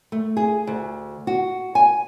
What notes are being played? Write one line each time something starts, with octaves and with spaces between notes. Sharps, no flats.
A3
G#4
D2
F#4
G#5